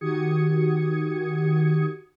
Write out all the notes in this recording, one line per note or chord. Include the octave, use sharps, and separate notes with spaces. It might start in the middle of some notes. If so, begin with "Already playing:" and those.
D#3 F#4 G4 D#6 G#6 C#7